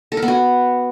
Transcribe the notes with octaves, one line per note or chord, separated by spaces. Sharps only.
A4
A#4
B3
F#4